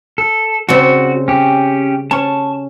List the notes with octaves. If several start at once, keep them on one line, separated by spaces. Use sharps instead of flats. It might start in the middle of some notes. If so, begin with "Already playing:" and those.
A4
C#3 G3 C4 F#4
C#4 G4
C#4 A5 C#6